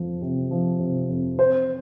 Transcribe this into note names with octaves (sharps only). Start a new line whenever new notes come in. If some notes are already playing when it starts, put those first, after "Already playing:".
Already playing: F2 F3
C3
F3
C3
F2
C4 C5